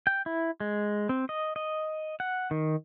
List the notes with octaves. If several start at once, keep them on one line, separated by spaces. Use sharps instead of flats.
G5
E4
G#3
C4
D#5
D#5
F#5
D#3